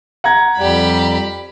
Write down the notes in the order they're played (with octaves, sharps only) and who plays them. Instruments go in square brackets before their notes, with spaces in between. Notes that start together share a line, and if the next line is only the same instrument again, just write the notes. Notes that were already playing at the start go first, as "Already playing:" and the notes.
[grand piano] F#5 A#5 G#6
[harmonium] F2 G3 [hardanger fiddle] G4 B5